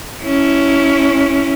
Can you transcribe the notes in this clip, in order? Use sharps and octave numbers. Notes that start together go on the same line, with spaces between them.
C#4 E4